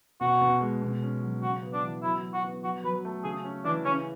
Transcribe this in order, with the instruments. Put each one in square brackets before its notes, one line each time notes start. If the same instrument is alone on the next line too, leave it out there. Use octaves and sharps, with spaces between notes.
[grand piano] B2 [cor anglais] F#4
[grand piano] B2
G#3
B2
C#4
F#3
[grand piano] C#3 [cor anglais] F#4
[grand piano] B3
[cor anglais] D4
[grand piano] E3
[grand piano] F#3 [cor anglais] E4
[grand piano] F#3
[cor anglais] F#4
[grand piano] B3
[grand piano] F#3 [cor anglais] F#4
[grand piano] F#3 [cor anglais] B4
[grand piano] A3
[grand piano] C#3 [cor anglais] G#4
[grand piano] C#4
[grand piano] E3 [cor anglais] D4
[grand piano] C#3 [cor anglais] C#4